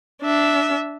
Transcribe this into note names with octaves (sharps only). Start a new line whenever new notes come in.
D4 E5